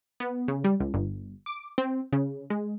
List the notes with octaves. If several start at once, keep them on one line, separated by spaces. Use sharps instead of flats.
B3
C#3
G3
C#2
G1
D6
C4
C#3
G#3